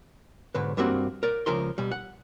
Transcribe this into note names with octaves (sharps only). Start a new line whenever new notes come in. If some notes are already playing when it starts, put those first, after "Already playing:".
B1 G#2 D3 B4
G2 G3 A#3 C4 F#4
A#4 D5
C#2 F3 A#4 C6
B2 G3
F#5